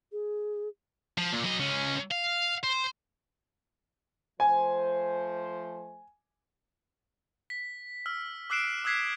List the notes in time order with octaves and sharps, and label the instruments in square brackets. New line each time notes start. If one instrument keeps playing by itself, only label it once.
[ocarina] G#4
[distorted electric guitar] F3
A#2
F#3 D#5
C#2 C#4
F5
C5
[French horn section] F3 A3 C5 [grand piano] G#5
[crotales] B6
E6 F6
D6 E6 F#6 C7 D7 E7
D#6 E6 F#6 G#6 B6 C7